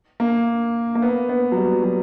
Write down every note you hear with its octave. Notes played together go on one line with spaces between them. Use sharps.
A#3
A#3
B3
B3
F#3
G3
F#3